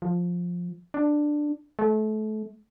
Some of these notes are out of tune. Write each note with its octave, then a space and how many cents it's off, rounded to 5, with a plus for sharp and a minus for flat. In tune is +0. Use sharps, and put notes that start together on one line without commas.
F3 +10
D4 +10
A3 -30